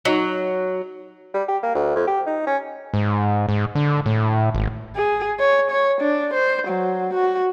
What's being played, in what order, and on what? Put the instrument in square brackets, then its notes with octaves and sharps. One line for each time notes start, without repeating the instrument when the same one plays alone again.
[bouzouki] F#3 [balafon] D#4 F#4 D#5
[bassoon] G3
G4
A#3
D2
F2
G4
D#4
C#4
[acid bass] G#2
G#2
D3
A2
G#1
[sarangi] G#4
C#5
C#5
D4
C5
F#3
F#4